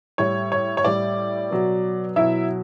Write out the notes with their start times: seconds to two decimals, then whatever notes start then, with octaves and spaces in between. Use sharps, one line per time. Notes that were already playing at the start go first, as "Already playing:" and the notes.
0.18 A2 G3 C#5
0.52 C#5
0.77 C#5
0.85 A2 G3 D5
1.50 B2 F#3
2.16 B2 F#3 E4 E5